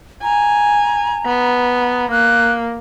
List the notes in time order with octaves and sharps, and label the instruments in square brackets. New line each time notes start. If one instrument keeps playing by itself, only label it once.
[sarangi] G#5 [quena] A#5
[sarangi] B3
[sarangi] A#3 [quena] F#6